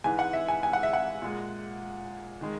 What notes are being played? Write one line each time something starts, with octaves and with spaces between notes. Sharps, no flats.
G#2 E3 G#3 G#5
F#5
E5
G#5
G#5
F#5
E5
F#5
A#2 G#3
D#3 G#3